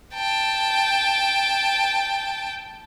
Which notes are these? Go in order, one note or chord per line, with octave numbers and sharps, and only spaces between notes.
G5 A5